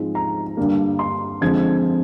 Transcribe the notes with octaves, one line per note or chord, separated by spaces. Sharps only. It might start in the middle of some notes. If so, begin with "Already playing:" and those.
Already playing: G#2 F3 G#3 C4
A#5
G2 D3 G3 A#3
C6
F2 D3 F3 G#3 G#6